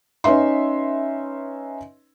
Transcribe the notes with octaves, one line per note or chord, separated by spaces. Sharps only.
C#4 D#4 B4 E5 C6